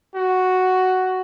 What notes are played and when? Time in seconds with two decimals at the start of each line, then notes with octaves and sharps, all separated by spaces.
0.16 F#4